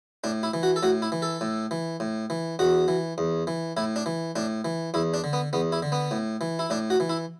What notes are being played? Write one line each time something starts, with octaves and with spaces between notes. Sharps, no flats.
A2 D4
E4
E3
F#4
A4
A2 F#4
E4
E3
A4
A2
E3
A2
E3
E2 F#4
E3
E2
E3
A2 E4
D4
E3
A2 D4
E3
E2 E4
D4
D3
B3
E2 B3
E4
D3
B3
A2
E3
E4
A2 D4
F#4
E3
E4